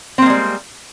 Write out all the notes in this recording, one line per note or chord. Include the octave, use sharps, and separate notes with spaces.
G3 G#3 A#3 C4